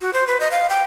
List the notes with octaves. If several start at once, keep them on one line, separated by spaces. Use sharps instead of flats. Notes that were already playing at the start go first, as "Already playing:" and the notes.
F#4
C5
B4
D#5
F5
G5